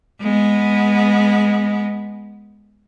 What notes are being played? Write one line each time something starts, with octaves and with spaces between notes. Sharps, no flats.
G#3 B3